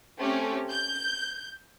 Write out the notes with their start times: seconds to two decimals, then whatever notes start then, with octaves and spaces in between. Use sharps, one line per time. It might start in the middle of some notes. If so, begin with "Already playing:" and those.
0.19 A3 C4 C#4 G4
0.70 G6